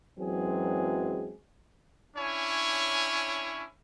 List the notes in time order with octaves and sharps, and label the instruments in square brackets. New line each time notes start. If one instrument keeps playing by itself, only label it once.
[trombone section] F#2 E3 F#3 G#3 C4 G#4
[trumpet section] C#4 D4 E4 C#5 G#5